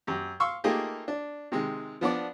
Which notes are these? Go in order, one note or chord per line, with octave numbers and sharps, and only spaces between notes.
F#2 G4
F5 C6 C#6 E6
A3 A#3 D#4 F4 G4 G#4
D4
C3 D#3 G#3
F3 B3 D4 D5